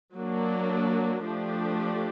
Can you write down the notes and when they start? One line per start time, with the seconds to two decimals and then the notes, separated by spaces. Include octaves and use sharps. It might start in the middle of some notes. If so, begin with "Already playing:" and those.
0.15 F#3 A#3 D4
1.25 F3 A3 D4 G4